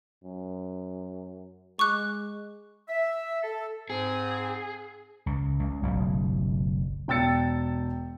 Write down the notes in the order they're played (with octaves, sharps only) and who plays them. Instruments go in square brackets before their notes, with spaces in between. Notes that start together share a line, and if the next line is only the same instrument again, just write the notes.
[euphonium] F#2
[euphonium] G#3 [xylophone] C#6 D6 F#6
[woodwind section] E5
A4
[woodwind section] G#2 C4 [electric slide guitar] G#4
[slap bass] C#2
C#2
F#1 B1 A2
[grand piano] E1 G5 E6 A6 C#7